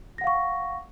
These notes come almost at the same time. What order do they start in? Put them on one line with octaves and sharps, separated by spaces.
A#6 F#5 F5 C#6